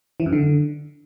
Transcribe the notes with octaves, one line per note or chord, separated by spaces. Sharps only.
E3
F#2
D3